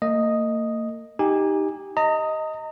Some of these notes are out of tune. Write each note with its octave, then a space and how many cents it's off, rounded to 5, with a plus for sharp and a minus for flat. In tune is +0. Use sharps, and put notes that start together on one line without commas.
A#3 -40 D#5 +0
D#4 +0 G4 +0 G#5 -20
D#5 +10 A#5 -35